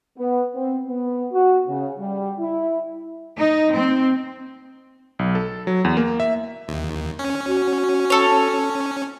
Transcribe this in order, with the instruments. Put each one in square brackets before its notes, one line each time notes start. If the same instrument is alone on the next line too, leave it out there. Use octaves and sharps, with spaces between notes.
[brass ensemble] B3
C4
B3
F#4
C#3
G3
E4
[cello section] D#4
C4
[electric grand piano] B1
A4
F#3
E2
A#3
E5
[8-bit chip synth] D#2
C#4
[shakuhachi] F#4
[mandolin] A4 C#5